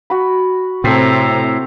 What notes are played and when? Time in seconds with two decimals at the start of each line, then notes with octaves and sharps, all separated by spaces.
0.10 F#4 B5
0.84 A2 C3 C4 A4 C5 A#5